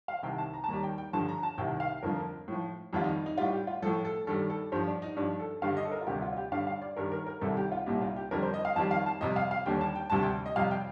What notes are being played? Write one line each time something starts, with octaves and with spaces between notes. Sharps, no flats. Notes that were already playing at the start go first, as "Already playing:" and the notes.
F5
C2 C3 D#3 G5
A5
A#5
A5
D#2 D#3 G3 A#5
G5
G5
G2 D3 F3 A5
A#5
A5
C2 C3 D#3 G5
F5
F2 D3 F3 A#4
A2 F3
F2 D#3 G3 F4
D#4
D#4
A2 G3 F4
G4
F4
A2 F3 A4
A4
G2 D#3 G3 A4
A4
G2 F3 C5
D4
D#4
G2 F3 D4
A4
G2 D3 G3 F5
D#5
A4
A#4
F4
D2 C3 G3 G4
F4
F4
G4
G2 D3 G3 F5
F5
D5
G2 D#3 G3 A#4
A#4
A#4
C2 C3 D#3 G3 A4
G4
F4
C2 A#2 G3 D#4
F4
G4
F2 D3 G3 A#4
C5
D#5
F5
F2 D#3 G3 A5
F5
A5
F2 C3 G3 D#5
F5
F5
D#2 D3 G3 G5
A5
G5
D2 C3 G3 A5
G5
D#5
F2 C3 G3 F5
G5